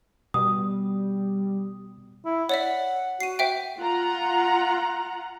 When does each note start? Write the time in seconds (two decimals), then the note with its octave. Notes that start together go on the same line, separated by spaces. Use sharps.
0.34 B2 G3 D#6
2.25 E4
2.49 C#5 D5 E5 F#5
3.20 F#4 C7 D#7
3.39 C5 E5 G5
3.79 F4 F#5 A#5